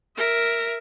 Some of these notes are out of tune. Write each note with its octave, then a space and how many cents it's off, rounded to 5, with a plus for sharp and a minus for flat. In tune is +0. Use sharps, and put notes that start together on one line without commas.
A#4 +0 E5 +0